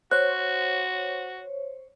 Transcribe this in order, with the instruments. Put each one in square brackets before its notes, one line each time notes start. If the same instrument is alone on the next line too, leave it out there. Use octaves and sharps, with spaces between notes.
[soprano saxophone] F#4 [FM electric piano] C5 C#5 [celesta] F#6